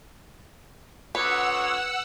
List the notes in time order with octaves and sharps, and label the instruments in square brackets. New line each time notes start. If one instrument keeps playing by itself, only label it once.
[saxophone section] D2 C#5 [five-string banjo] B4 [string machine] F#5 E6